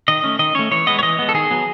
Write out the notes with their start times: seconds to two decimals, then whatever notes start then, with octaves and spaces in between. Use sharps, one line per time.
0.08 D#3 D#5
0.24 A3 C#4
0.39 D#3 D#5
0.55 A3 C#4 C#5
0.71 E3 C#5
0.87 G#3 B3 D#5
0.99 C#5
1.03 E3 D#5
1.19 G#3 B3
1.29 A4
1.34 D#3 G#4
1.51 F#3 B3